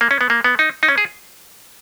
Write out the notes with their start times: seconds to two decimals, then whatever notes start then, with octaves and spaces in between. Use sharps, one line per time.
0.01 A#3
0.11 C#4
0.21 B3
0.30 A#3
0.44 B3
0.59 D#4
0.83 D#4
0.88 C#4
0.98 G#4